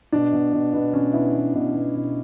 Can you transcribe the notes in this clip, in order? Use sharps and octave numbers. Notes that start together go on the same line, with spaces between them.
B2 D4
B2
B2
B2 B3
B2 C#4
B2 E4
B2
B2
B2
B2